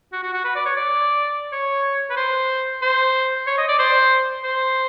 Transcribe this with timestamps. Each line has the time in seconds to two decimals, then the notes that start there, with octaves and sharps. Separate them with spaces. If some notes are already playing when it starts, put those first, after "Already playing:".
0.13 F#4
0.23 F#4
0.33 F#4
0.44 B4
0.55 D5
0.66 C#5
0.76 D5
1.53 C#5
2.10 B4
2.17 C5
2.82 C5
3.47 C#5
3.58 D#5
3.69 D5
3.79 C5
4.44 C5